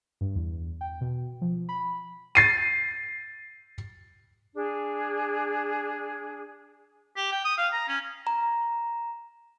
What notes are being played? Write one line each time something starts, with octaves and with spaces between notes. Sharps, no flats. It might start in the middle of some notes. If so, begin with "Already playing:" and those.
G2
E2
G5
B2
F3
B5
A6 C7 D#7
D4 G#4
G4
G5
D#6
F5
A#5
C#4
A#5